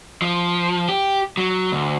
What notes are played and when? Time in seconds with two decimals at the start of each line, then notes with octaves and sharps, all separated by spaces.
0.22 F3
0.89 G4
1.37 F#3
1.72 D2